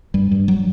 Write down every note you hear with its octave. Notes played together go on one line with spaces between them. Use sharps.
G2 G3
G2
F#3